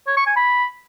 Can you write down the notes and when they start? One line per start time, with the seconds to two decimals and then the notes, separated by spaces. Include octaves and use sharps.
0.07 C#5
0.17 C#6
0.27 G#5
0.36 B5